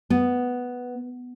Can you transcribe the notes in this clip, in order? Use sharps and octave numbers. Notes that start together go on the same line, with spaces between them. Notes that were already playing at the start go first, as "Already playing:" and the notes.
B3